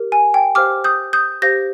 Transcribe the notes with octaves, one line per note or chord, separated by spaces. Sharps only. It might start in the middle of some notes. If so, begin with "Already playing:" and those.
Already playing: G4 A#4
G#5
G5
G4 C5 F5 D6 F6
D#6 G6
D#6 G6
G4 C5 F5 G6 A#6